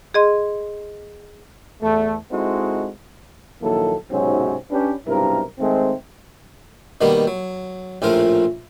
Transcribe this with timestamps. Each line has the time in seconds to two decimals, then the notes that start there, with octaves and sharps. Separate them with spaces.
0.14 G#4 D#5 C6
1.81 E2 A3
2.31 G#3 C4 D#4 E4 F#4 A4
3.62 A#1 D#3 F#3 A#3 E4 A4
4.11 B1 G#2 C3 F#3 C4 C#4
4.71 C#4 D4 G4 B4
5.06 B1 G2 C3 E4 A#4
5.59 D#3 G#3 A3 C4
7.01 B2 D#3 G3 A#3 B3
7.27 F#3
8.02 A#1 A2 F3 F4 A#4